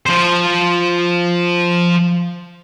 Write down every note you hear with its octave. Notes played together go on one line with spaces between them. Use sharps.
F3 C5